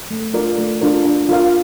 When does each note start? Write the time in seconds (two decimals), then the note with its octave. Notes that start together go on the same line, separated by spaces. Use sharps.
0.11 A3
0.34 D4 F4 A#4 D5
0.58 A3
0.81 D4 F4 A#4 D5
1.05 D4
1.29 F4 A#4 F5